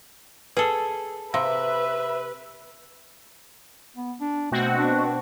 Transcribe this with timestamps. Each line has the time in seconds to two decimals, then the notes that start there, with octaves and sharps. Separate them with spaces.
0.57 G#4 A4 B4
1.34 C3 B4 E5 F5
3.96 B3
4.21 D4
4.52 B2 A3 C4 F#4
4.78 D4